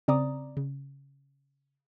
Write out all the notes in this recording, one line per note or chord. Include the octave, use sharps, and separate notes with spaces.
C#3 C4 D5 A#5 D6 D#6
C#3